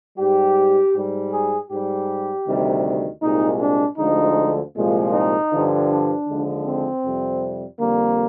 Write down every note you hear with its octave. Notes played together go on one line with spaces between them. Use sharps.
G#2 G3 G4
G#2 G3
G#4
G#2 G3 G4
D2 C3 D#3 G3
C2 A#2 G#3 D#4
D4
D2 D3 F3 G#3 D#4
C2 A#2 F3 G#3
D#4
G2 D3 F3
D4
D#2 D3 F3 G#3
C4
F2 C3 G3
F2 D3 G3 A#3